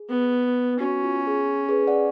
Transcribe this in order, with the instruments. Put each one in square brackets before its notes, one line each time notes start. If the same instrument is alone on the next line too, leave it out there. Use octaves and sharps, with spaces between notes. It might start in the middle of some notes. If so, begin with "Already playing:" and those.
Already playing: [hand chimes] G#4
[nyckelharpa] B3
[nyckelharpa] C#4 [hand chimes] F#4
[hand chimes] F4
G#4
G#4 B4
D5 F#5